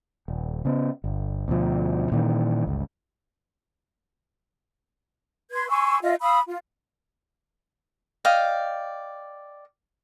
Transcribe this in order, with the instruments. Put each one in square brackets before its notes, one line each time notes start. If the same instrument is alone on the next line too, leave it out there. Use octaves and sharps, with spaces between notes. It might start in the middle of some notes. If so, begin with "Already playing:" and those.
[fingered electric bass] D#1
C#3 B3
G1
D2 B2 F3
A#2 D#3 E3
G1 C#2
[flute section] B4 C6 G#6
G#5 C6 C#6 E6
F4 D#5 E5
F5 B5 D#6 E6
F4
[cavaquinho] D5 D#5 F5 G5